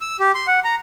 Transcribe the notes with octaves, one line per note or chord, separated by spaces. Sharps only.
E6
G4
C6
F#5
A#5